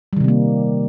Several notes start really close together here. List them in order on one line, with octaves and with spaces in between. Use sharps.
G3 D#3 C3 C4 A#3